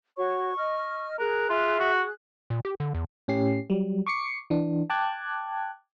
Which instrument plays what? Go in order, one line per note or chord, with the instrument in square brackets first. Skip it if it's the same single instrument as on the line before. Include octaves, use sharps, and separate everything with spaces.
[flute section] F#4 C#5 [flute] C#6
[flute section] D#5 F6
[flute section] G#4 F#6 [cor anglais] A#4
[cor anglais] F4 [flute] E5
[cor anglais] F#4
[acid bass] A#2
G4
D3
E2
[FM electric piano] A2 C#4 G4 C7
F#3 G3
C#6 D6 C7 C#7
E3 D4
G5 A5 D6 F#6 G#6